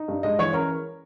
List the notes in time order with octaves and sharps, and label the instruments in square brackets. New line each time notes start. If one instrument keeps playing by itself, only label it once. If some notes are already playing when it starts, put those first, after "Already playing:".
Already playing: [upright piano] D#4
G2
G#3 D#5
E3 C#5
C#4 A#4